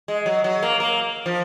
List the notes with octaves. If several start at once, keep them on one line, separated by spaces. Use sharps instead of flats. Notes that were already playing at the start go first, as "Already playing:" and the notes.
G#3
F#3
F#3
A#3
A#3
F3